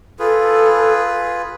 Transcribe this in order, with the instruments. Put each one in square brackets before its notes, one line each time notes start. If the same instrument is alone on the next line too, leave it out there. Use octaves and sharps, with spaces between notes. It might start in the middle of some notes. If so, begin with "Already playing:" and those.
[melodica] F4 G#4 B4 [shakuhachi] A4